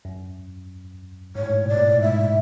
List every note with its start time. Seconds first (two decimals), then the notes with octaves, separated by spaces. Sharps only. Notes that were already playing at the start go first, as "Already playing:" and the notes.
0.05 F#2
1.35 G#2 C#5
1.43 A2
1.50 G#2
1.65 B2 D5
1.77 A#2
1.88 A2
2.01 G#2 E5